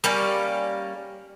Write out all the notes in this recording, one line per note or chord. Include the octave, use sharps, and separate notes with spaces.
G3 A#3 C#4 D5